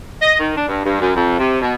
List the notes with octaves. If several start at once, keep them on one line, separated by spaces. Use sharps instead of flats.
D#5
D#3
D4
G2
G2
F#2
F2
C3
B2